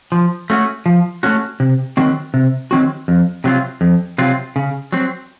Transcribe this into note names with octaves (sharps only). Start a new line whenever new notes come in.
F3
A3 C#4 F#4
F3
A3 C#4 F#4
C3
D#3 F#3 C4 F#4
C3
D#3 F#3 C4 F#4
F2
C3 F#3 C4 F4
F2
C3 F#3 C4 F4
C#3
F#3 C4